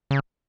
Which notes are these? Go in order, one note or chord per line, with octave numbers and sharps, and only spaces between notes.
C#3